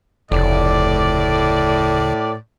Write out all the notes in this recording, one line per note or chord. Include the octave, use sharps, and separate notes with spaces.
F1 D2 A2 C#3 D5